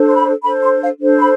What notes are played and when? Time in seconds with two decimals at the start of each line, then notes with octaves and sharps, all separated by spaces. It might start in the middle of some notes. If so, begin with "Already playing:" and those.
Already playing: D4 A4 C5
0.09 C6
0.16 B5
0.44 D4 A4 C5 B5
0.62 C6
0.82 F5
1.00 D4 A4 C5
1.19 B5